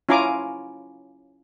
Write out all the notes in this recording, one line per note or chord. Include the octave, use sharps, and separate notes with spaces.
C#4 E4 F4 G#5 A#5 D6